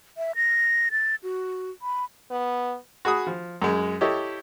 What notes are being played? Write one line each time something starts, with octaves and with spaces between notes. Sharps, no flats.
E5
A#6
A6
F#4
B5
B3
F#4 G#4 B5 D#6
F3
F#2 G#3
E4 G4 A4 C#5 D#5